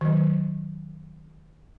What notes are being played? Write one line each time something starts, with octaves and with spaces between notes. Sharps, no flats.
D#3 F#3